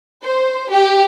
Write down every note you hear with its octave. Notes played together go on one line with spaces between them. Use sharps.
C5
G4